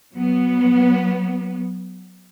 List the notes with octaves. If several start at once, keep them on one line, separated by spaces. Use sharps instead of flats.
F#3 B3